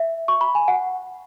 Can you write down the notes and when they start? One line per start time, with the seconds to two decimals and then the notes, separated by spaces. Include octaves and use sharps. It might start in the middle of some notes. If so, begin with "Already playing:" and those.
Already playing: E5
0.28 C#6
0.41 B5
0.55 G#5
0.68 F#5